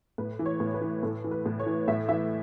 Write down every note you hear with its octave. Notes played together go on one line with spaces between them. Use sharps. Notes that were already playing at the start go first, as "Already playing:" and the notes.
A2 B4
E3
C#5
A2
B4
E3
A2 A4
E3
B4
A2
C#5
E3
A2 E5
E3 E5